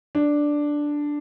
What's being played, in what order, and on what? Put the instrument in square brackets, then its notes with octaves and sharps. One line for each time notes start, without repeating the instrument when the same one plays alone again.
[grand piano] D4